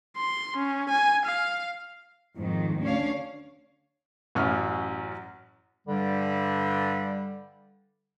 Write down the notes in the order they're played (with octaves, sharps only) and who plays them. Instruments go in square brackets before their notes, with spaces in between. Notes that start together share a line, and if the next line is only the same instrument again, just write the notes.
[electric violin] C6
C#4
G#5
F5
[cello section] F2 G#2 D#3
D2 C#4 D4 C#5 F5
[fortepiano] A1 F#2 C#4 F6
[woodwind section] G2 D3 G3